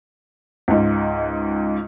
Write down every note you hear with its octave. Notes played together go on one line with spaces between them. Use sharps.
C#2 G#2